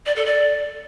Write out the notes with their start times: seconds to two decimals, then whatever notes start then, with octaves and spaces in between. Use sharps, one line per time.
0.06 D5
0.16 A4
0.26 D5